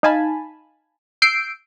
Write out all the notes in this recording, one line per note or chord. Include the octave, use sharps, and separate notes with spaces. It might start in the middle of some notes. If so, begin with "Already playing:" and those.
D#4 F5 G#5 A5 B5
E6 G6 C7 D7